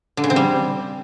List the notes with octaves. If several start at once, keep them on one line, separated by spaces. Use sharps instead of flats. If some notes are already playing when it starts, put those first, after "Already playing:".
D3
C#3
C4
G3